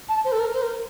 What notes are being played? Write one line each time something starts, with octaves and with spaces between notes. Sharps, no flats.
A5
C5
A4
A#4
C5
A#4